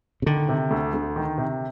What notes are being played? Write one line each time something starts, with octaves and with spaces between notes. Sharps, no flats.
C3
D3 D#3
C3
D2
D2
D#3
C3